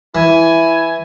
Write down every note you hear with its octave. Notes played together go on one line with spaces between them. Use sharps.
E3 E4 G#5